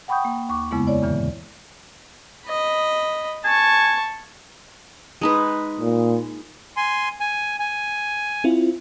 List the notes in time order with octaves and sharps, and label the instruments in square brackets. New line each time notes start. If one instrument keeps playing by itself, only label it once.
[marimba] F#5 G5 B5 C#6 D#6 G6
A#3
D#2 C#6 D6
F2 C#3 G#3 A#3 B3 E4
E4 C#5 D5
E2 G2 A#2 D3 E3
[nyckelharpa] D#5 B5
[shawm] G#5 [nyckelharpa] A5 C#6
[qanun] G#3 D#4 B4
[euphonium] A#2
[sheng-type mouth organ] G#5 C6
G#5
G#5
[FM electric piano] C4 E4 F4